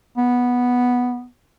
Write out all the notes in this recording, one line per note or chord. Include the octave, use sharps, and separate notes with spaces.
B3